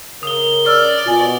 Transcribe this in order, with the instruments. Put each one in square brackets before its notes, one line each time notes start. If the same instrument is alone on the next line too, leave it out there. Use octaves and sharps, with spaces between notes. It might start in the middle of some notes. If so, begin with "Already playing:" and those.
[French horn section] C#3 A#4 [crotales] D#6 G7
[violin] D5 [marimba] E6 F6
[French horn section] B2 [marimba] F4 G#5